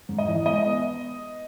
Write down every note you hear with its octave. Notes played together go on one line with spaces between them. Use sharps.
G#2
D#5
E3
G#3 D#5
B3